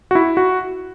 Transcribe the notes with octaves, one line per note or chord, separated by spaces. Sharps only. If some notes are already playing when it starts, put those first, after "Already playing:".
F#4
E4
F#4